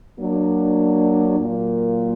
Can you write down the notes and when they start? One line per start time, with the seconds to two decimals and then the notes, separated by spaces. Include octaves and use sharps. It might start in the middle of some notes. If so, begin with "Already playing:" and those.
0.18 F#3 A#3 D4
1.37 A#2 F#3 A#3